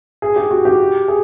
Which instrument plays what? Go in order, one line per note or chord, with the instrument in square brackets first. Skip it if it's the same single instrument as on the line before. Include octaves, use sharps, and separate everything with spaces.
[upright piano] G#4
G4
F#4
G4
G#4